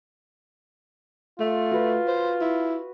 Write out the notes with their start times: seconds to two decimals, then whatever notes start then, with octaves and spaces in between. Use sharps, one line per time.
1.40 A3 F4
1.71 F#4 B4
2.08 C5
2.41 E4